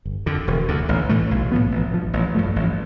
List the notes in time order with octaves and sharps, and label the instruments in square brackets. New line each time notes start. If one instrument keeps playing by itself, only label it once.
[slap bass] G1
F2 D3
E1
D2 D3
A1
A2 E3 A3
B1
A2 F3 B3
A1
G2 F3
A1
G2 F3 A3
A1